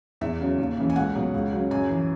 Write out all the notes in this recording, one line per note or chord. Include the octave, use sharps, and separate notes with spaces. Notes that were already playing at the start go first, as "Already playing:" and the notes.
E2 E5
C#3 F#3
D#2
C#3 E3
G#5
C#2 F#5
B2 F#3
C#2
C#3 F#3
F#2 G#5
E3